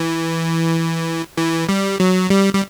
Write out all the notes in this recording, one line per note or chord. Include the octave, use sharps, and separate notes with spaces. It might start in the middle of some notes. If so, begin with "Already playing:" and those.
Already playing: E3
E3
G3
F#3
G3
G3